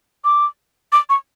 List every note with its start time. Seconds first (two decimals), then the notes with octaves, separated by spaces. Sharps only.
0.24 D6
0.92 D6
1.10 C#6